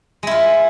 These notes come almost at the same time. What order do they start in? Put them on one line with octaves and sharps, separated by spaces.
G#3 E4 F4